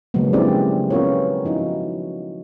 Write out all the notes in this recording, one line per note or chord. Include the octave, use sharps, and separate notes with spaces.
C#3 F3 F#3 G#3 A#3 B3
C4 D4 E4 G4 G#4 D5
B3 C#4 F4 A#4 B4 C#5
F3 D#4 E4 F#4